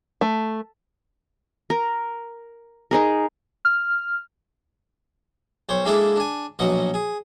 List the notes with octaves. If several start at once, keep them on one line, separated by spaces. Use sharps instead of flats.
A3
A#4
D#4 G#4 A#4
F6
B1 C5 C#5
G#3 A#3 D4 E4 G#4 A4
D4 G#5
A#1 B2 F#3 D#5 F#5
G#4